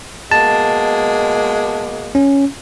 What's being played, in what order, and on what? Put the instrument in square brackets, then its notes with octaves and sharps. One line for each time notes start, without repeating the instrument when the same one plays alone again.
[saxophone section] B2 G#3 A#3 [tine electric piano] A5
[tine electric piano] C#4